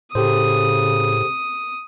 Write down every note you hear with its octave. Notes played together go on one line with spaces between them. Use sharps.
A2 C#3 G4 A4 C5 D#6